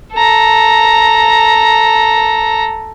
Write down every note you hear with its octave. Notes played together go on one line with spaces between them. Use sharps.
A4 A#5